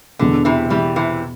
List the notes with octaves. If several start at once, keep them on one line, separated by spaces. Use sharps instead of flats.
E2 B2 D3 B3
C3 E3
E2 B2 E3 G3 B3
C3 E3